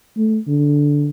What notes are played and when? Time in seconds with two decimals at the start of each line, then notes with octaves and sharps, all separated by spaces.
0.17 A3
0.47 D3